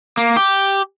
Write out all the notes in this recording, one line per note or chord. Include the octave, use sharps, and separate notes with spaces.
A#3
G4